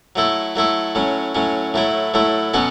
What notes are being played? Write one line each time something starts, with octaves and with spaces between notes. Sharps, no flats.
F#3 A3 E4 A4
F#3 A3 E4 A4
A2 F#3 C#4
A2 F#3 C#4
A2 F#3 A3 E4
A2 F#3 A3 E4
B2 F#3 C#4 F#4 A4